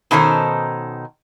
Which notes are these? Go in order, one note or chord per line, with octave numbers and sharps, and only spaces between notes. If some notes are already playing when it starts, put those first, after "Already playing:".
B2 D#3 C#4 D#4 A4 C5